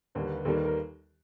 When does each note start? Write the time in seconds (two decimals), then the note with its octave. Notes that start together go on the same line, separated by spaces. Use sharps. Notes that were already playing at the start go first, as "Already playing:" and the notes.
0.15 D#2 D3 G3 A#3 B4
0.25 B4
0.35 B4
0.45 D#2 D#3 G3 A#3 A4
0.55 B4
0.65 A#4